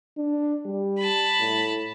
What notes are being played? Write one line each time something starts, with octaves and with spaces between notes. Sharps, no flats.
D4
G3
A5 B5
A2